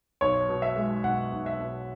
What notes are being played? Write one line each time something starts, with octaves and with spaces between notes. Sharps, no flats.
B1 C#5
B2
E5
G#3
B1 F#5
B1
E5
B2